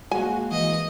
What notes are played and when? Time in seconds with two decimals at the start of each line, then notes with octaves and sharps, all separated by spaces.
0.11 G#3 A#3 F#4 G#5
0.51 E3 D#5